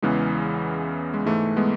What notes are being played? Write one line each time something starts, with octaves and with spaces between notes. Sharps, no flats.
E2 C#3 E3 G#3 B3
G#3
G#2 E3 A3
G#3 B3